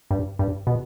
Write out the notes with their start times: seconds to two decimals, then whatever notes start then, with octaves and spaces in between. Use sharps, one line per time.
0.11 G2
0.39 G2
0.67 B2